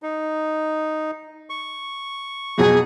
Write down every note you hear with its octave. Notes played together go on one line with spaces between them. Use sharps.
D#4
C#6
F2 B2 F#3 G#4